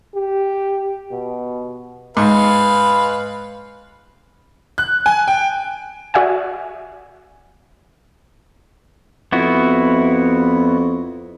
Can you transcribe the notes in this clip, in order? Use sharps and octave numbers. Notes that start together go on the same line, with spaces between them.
G4
B2
G#2 B4 F5
F#6
G#5
G5
F#4 D5 E5 F#5 G#5
F2 B3 E4 F#4